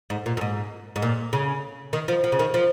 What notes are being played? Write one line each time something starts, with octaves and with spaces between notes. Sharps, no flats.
G#2
A#2
F#2
G#2
G#2
A#2
C#3
D#3
F3
F3
C#3
D#3
F3